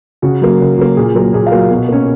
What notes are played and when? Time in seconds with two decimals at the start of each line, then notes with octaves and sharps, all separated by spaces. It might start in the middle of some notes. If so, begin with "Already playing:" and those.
0.22 C#3 F#4
0.42 F#3 A#3
0.60 C#3
0.78 F#3 A#3
0.97 A#2 G#4
1.15 F#3 A#3 A#4
1.33 A#2 G#4
1.46 F5
1.52 F#3 A#3
1.71 B2
1.89 A#3 C#4